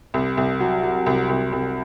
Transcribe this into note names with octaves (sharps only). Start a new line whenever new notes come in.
C2
C2
F#3
F#3
C2
C2
C2